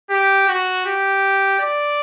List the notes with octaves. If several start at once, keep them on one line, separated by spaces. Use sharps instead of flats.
G4
F#4
G4
D5